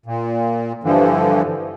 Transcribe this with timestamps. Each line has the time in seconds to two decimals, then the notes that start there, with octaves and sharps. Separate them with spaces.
0.06 A#2
0.84 G2 D3 E3 F3